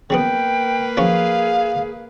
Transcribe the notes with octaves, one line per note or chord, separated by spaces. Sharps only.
C#3 F#3 A#3 B3 B4 G5
F3 F#3 C#4 G#4 F5